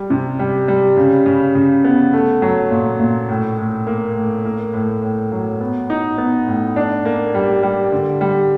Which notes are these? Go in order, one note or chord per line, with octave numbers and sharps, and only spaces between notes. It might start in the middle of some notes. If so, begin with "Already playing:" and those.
Already playing: G3
C3
G3
G3
C#3
C#3
C#3
B3
A3
F#3
A#2
A#2
A2
A2
A#3
A2
A#3
A2
A2
F#3
B3
D#4
B3
A2
D4
A#3
G3
G3
D3
G3